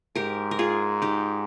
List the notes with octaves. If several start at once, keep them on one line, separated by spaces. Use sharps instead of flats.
G#2 G4 A#4
A#4
F4 G#4
D#4 G4